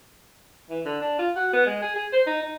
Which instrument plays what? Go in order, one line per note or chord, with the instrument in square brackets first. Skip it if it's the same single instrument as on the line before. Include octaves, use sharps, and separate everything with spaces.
[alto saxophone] E3
D3
D4
F4
F#4
B3
G#3
G#4
G#4
C5
D#4
D#4